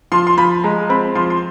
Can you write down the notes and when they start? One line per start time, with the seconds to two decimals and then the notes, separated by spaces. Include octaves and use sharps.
0.12 F3 C6
0.27 C6
0.37 F3 B5
0.64 G#3 A#5
0.89 C4 B5
1.15 F3 C6
1.30 C6